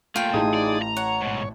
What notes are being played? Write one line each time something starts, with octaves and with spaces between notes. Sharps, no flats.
A#2 A3 F4 G5
A1 D#4 E4 G#4 A5 D#6
D5
A#5
C#5 F#5
G#2 B2